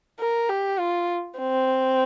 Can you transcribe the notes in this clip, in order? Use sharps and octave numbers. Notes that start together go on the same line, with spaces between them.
A#4
G4
F4
C4